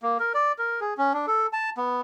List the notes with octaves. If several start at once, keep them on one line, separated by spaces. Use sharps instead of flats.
A#3
A#4
D5
A#4
G#4
C#4
D4
A4
A5
B3